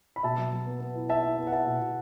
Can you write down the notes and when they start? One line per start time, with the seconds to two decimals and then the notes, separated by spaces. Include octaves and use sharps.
0.16 B5
0.23 B2 E5 A5
0.38 F#3
0.52 F#3
0.66 B3
0.81 B3
0.95 E4
1.09 E4 E5 A5
1.24 E4
1.38 B3
1.47 F#5
1.52 B3 E5 A5
1.67 B2
1.81 B2